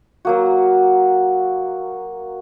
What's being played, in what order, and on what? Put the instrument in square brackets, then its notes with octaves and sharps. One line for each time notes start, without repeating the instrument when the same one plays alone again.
[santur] F#3 A#3 F#4